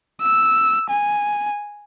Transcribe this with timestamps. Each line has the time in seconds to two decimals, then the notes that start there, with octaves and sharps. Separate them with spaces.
0.22 E6
0.90 G#5